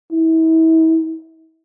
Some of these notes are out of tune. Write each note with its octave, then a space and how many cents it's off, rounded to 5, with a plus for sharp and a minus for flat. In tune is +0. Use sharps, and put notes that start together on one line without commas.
E4 -35